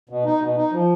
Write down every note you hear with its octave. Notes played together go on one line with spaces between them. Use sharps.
B2
D#4
B2
D#4
F3